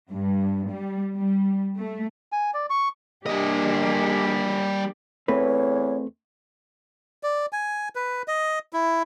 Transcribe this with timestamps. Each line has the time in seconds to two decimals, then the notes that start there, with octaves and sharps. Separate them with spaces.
0.10 G2
0.69 G3
1.15 G3
1.77 A3
2.32 G#5
2.54 D5
2.70 C#6
3.26 G3 A#3 D4 G4 D#5
5.28 E2 A3 C4 B4 C#5
7.23 D5
7.53 G#5
7.95 B4
8.28 D#5
8.73 E4